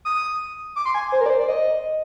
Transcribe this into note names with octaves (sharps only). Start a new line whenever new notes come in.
D#6
D6
C6
G#5
C5
A#4
D5
C5
D5
D#5